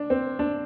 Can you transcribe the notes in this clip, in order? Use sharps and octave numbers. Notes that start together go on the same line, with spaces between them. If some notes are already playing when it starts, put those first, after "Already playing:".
Already playing: D4
C4
D4